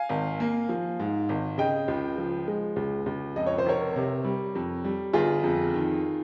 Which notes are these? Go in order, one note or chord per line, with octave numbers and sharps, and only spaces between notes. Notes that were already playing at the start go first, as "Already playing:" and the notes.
Already playing: F5 G#5
G#1
A#3
F3
G#2
G#1
C#3 D#5 G5
C#2
F3
G#3
C#2
C#2
F2 D#5
C#5
C5
F1 A#4 C#5
C3
G3
F2
G3
G1 F4 G#4
F2
D#3